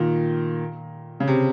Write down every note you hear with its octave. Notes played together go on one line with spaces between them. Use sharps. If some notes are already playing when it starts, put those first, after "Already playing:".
Already playing: A#2 D#3
C#3
C3